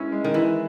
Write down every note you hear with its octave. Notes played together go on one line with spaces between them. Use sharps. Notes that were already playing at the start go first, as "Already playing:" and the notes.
Already playing: G#3 C#4 E4
G#3
D#3
E3 E4